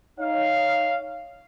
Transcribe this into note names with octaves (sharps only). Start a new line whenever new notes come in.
D#4 C#5 F5